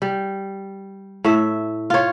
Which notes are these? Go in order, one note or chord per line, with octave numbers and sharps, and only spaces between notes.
G3
A2 E5
F4 C#5